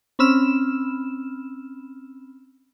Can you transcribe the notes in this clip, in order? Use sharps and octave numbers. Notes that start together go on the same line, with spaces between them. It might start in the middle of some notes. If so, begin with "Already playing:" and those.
C4 C#4 B5 E6 F6 E7